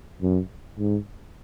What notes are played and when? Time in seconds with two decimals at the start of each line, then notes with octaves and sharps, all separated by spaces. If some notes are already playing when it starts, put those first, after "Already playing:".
0.22 F#2
0.79 G#2